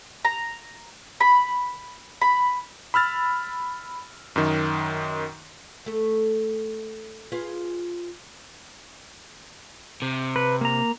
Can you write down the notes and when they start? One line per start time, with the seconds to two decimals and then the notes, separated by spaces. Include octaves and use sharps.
0.25 A#5
1.20 B5
2.21 B5
2.94 B5 E6 F6 A6
4.36 F#2 D#3
5.86 A3 A4
7.32 F4 G#4 B4
10.02 C3
10.36 B4
10.61 A#3 A#5